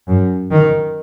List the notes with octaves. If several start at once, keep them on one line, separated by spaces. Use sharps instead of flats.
F#2
D#3